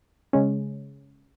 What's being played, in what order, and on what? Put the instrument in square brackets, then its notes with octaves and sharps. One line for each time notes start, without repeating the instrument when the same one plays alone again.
[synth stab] C#3 G#3 C#4